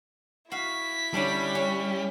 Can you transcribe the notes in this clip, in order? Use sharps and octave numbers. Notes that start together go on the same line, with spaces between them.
E4 F#4 F5 B6
D3 G3 C#4 D4
C#4